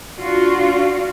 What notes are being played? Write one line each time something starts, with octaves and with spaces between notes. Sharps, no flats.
D4 F4 F#4